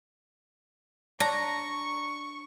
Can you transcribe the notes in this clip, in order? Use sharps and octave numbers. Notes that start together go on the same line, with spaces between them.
D4 A#5 C#6